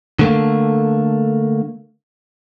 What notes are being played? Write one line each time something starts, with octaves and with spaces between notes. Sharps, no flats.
D3 A3 A#3